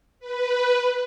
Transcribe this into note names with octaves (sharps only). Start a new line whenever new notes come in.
B4